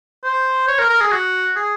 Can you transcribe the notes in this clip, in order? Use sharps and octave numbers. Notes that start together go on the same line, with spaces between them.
C5
C#5
A#4
A#4
G#4
F#4
G#4